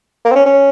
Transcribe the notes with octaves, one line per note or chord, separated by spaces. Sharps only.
A#3
C4
C#4
C#4